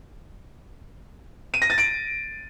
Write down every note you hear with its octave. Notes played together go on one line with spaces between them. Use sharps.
D#7
A#6
A6
D7